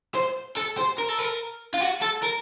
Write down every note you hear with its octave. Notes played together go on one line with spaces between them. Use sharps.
C5
A4
C5
A#4
A4
A#4
F4
F#4
A4
A#4